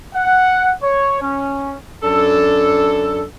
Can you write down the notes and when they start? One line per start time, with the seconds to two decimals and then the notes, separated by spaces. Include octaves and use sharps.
0.14 F#5
0.82 C#5
1.21 C#4
2.03 F#2 D4 A4